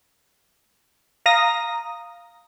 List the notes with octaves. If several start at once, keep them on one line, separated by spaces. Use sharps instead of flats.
F5 A#5 D#6 A#6